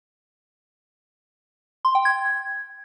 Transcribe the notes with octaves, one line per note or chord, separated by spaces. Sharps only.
C6
G5
G#6